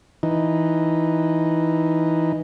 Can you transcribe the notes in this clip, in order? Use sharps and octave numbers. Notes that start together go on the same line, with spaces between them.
E3 D#4